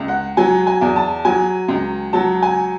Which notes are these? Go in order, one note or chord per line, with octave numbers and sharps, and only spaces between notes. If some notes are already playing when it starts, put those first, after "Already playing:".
Already playing: C#2
F#5
F#3 G#5
G#5
E2
A5
F#3 G#5
C#2
F#3 A5
G#5